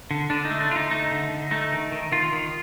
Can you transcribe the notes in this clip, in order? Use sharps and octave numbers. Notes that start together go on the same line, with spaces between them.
D3
D3 D4
D#4
A3
D4
D3 F4
D#4
A3 D#4
D3
D3
A3 D#4
D#3
D#3
D#3 F4
D#3